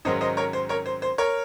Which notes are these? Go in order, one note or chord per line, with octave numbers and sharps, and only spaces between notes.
G#2 D#3 F#3 C#4 C5 D#5
C5 D#5
A#4 C#5
C5
A#4 C#5
C5
C5
A#4 C#5